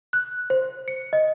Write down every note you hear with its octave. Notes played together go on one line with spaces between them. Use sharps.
F#6
C5
C#7
D#5